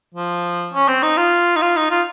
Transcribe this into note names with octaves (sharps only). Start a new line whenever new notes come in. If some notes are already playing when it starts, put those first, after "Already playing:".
F3
C#4
C4
D#4
F4
D#4
F4
D#4
F4